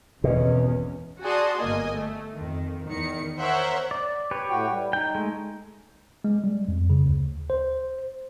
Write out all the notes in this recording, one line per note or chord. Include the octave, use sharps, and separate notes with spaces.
G#1 E2 B2 C#4
F#4 G#4 D5 A5 C6 D#6
G1 A#3 D#5 G#5
A3
F2 D#3
E2 D#3 C#7
A#4 C5 C#5 E5 F#5
D5
G4 B4 C#5
A2 F#4 G5
G3
D#4 G5
G#3 A3
G#3
G3
F2
C#3
D2
C5